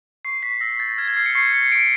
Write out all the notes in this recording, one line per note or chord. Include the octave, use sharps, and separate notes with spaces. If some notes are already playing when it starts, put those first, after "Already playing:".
C#6 C7
C#6 B6
B6
E6 A#6
G6 A6
F6 G#6
G#6
F6 C7
C#7
C#6 C7
C#6 C#7
C#6 D7